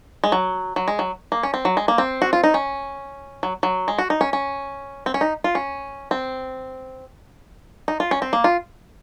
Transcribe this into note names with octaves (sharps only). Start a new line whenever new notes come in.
G#3
F#3
F#3
G#3
F#3
A#3
C#4
C4
F#3
G#3
A#3
C4
F#4
F4
D#4
C#4
F#3
F#3
G#3
F#4
D#4
C#4
C#4
C4
C#4
D#4
F4
C#4
C4
D#4
F4
C#4
C4
A#3
F4